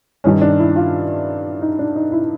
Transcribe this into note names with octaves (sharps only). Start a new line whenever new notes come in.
G2 D#3 C#4
D4
E4
F4
D#4
D4
D#4
E4